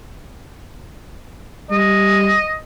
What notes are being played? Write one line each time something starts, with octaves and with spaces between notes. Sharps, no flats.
G3 D#5